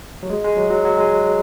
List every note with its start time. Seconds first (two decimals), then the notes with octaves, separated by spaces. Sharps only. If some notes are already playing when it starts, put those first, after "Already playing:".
0.23 F#3
0.30 G#3
0.44 G#3
0.57 F#3
0.70 F#3
0.85 F#3
0.98 G#3